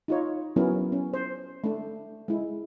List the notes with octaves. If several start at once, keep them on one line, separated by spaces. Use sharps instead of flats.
D#4 F4 C#5
F#3 B3 C#4 E4 A#4
C#4
C5
A3 D4
G#3 E4